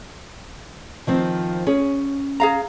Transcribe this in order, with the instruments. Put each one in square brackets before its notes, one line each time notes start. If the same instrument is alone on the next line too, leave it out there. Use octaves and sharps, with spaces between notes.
[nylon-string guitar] D#3 F3 C4
[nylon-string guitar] C#4 [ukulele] G#4
[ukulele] G#4 F5 A#5